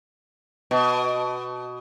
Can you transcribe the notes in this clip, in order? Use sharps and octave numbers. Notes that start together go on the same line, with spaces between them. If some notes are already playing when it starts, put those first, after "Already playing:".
B2